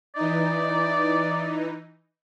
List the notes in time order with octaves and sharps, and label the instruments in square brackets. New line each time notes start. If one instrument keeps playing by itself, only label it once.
[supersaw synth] E3 D#4 [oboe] D5